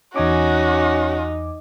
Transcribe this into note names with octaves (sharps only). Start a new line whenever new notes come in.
E2 C#4 D#4 F#4 G#5 D6